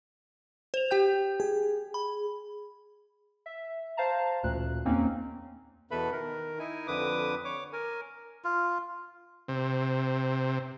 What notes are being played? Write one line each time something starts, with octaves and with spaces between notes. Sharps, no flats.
C5 F7
G4 G5 G6
G#4
B5
E5
C5 F5 A5 A#5
A1 D2 A#2 F#6
E2 A#3 C4 C#4 D#4
E2 B2 A4 B4 E5 B5
D#3 A#4
D#4 E4 G#5
F2 D3 B4 D6 D#6
C#5 D6
A#4 G#5
F4
C3